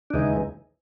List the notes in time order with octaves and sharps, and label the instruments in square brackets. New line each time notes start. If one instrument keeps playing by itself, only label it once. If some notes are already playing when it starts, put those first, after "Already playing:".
[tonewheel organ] D4
D#2 C#3 E3 G#3 D#4